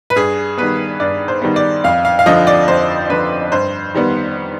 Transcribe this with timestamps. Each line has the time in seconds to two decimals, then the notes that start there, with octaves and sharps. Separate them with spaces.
0.10 B4
0.16 G2 G#4
0.58 D#3 G3 B3 B4
1.00 G2 D5
1.28 C5
1.42 D#3 G3 B3
1.56 D5
1.84 F2 F5
2.05 F5
2.19 F5
2.26 D3 F3 D#5
2.47 D5
2.68 F2 C5
3.10 D3 F3 B4
3.52 G2 C5
3.95 D#3 G3 B3